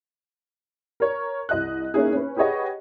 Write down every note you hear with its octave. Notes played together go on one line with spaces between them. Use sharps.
A#4 C#5
C2 D#5 F#6
A#3 C#4 D#4 E4 G#4
C#4 B4
G4 G#4 B4 C#5 D#5 F#5